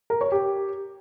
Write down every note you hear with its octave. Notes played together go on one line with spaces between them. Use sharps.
A#4
C#5
G4